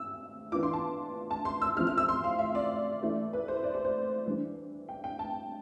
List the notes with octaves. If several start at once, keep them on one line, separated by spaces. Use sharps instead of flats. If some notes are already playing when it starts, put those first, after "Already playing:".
Already playing: E6
E3 B3 D4 F4 D6
C6
A5
A5
C6
E6
F3 C4 E4 F6
F6
E6
C6
F5
E5
D5
E3 A3 E4
B4
C5
D5
C5
C5
E3 G3 D4
G5
G5
A5